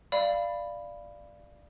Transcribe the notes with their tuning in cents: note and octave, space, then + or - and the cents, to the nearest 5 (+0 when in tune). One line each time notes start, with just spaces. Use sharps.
D5 +10 F5 -20 B5 +0